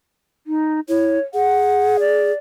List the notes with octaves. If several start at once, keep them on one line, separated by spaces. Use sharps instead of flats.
D#4
E4 C#5
G#4 F#5
D5